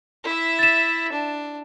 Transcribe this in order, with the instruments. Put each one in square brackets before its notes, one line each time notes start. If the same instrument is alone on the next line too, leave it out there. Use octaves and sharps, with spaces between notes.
[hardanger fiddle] E4 E5
[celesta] A6 E7
[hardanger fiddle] D4